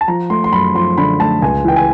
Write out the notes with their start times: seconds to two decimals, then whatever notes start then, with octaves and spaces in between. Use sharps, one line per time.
0.01 A5
0.08 F3 A#5
0.30 A3 C6
0.44 C6
0.52 F#2 B5
0.75 F3 C6
0.98 D3 B5
1.20 A3 A5
1.42 C#2 G#5
1.65 E3 G5
1.76 G#5